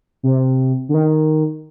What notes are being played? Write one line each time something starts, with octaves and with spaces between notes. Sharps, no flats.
C3
D3
D#3